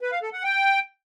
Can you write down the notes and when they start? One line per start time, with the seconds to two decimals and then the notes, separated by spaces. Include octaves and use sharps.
0.01 B4
0.12 F5
0.22 A4
0.33 F#5
0.44 G5